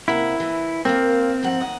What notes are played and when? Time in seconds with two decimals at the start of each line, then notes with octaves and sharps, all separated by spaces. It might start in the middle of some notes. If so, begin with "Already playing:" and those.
0.08 C3 A#3 E4 F#5
0.40 E3
0.85 A#3 C4 F4
1.43 G#2 F3 F#5
1.61 D#2 D#5 F#5